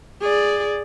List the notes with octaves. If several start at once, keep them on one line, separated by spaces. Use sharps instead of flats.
G#4 D5